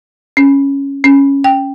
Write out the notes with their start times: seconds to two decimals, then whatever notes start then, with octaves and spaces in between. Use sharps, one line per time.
0.37 C#4
1.04 C#4
1.44 G5